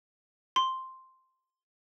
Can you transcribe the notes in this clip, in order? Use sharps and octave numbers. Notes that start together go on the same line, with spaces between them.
C6